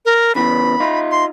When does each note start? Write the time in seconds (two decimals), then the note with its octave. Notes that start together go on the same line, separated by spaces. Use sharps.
0.06 A#4
0.35 C#3 E3 B3 B5
0.80 D#4 F4
1.11 C6